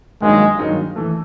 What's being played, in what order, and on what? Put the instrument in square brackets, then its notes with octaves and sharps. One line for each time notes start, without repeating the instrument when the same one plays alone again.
[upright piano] G2 D#3 F#3 A#3 D#4 [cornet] G#3
[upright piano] G2 D#3 F#3 A#3 D#4
E3 A3